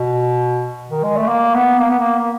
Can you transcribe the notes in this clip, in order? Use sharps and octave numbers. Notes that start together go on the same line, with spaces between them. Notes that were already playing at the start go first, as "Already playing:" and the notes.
Already playing: B2
D#3
G#3
A3
A#3
B3
A#3
B3
A#3
A#3